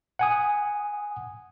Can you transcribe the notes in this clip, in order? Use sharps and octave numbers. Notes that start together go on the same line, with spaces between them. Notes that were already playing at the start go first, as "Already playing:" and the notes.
F#5 G#5 D#6